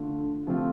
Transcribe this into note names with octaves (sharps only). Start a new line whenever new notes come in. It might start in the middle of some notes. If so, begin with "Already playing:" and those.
Already playing: D3 A3 D4 F4
C3 F3 A3 C4 F4